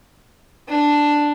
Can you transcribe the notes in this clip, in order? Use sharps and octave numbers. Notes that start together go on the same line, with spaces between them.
D4